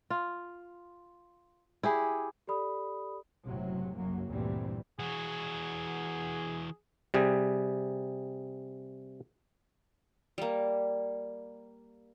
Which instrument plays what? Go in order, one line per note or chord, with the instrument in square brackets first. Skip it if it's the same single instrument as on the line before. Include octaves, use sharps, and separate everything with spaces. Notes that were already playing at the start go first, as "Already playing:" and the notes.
[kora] F4
E4 G4 G#4
[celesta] G4 A4 D5 B5 D#6
[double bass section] F#1 A2 C3 F#3
F#1 C2 F#2 F#3 A#3
D2 G2 A#2 E3 G3 C4
[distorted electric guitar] E3 F#4 [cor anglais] G#4
[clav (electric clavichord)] C3 G3 G#4
[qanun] G3 A#3